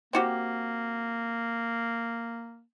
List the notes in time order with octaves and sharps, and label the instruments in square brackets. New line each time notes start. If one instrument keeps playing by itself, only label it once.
[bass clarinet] A#3 [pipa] C4 F#4 G4